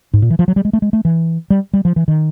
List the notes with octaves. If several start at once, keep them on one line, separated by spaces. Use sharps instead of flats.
G#2
A#2
E3
F3
F#3
G3
G#3
A3
G#3
A3
E3
G3
G3
F3
E3
D#3